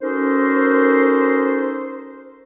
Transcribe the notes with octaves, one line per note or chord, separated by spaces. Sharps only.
C#4 D#4 F#4 A4 A#4 C5